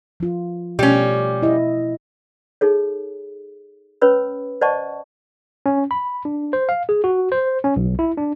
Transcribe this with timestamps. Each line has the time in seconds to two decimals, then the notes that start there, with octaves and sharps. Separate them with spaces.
0.20 F3 F4
0.79 B2 G3 A3 C#4
1.42 E4 D#5
2.61 D#4 G#4 A4 C#5
4.02 C#4 B4 C#5 B5 E6
4.61 C5 D5 D#5 F#5 A5 C#6
5.66 C#4
5.91 B5
6.25 D4
6.53 C5
6.69 F5
6.89 G#4
7.04 F#4
7.32 C5
7.64 C#4
7.76 B1
7.99 E4
8.18 D4